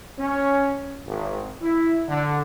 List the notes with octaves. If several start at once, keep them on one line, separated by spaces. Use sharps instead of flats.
C#4
G#1
E4
D3